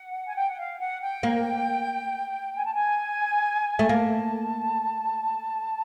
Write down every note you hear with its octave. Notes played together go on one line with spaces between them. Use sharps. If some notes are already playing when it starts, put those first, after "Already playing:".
Already playing: F#5
G#5
G5
F#5
F5
F#5
G5
A#3
G#5
A5
G#5
A3
A#3 A5